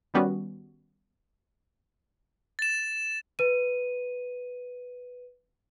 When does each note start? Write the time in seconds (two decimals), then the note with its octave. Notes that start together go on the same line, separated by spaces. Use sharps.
0.14 D#3 G3 B3 C#4 F#4
2.59 A6 E7
3.39 B4 D#7